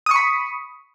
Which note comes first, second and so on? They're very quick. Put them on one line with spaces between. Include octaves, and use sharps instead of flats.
D#6 C#6 B5